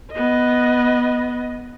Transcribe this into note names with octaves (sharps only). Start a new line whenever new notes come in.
B3 D#5